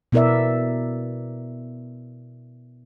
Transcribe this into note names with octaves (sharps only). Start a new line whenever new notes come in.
B2 B3 E4 A#4 D5 E5